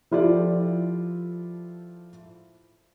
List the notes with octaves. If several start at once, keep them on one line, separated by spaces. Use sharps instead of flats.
F3 E4 F4 G4 A4 D5